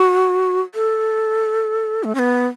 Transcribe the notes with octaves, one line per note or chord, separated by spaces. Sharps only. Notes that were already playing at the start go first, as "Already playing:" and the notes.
Already playing: F#4
A4
A3
C#4
B3